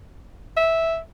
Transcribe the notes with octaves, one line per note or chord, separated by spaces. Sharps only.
E5